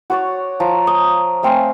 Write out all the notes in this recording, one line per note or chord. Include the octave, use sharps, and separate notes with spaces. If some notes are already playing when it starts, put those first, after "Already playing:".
F#4 C#5 D5
F3 A5 A#5
D#6
A3 C4 F5 G#5